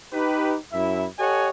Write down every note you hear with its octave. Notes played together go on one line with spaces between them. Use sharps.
D#4 G4 B4
F#2 E4 E5
G4 A4 C#5 D#5 F#5 G#5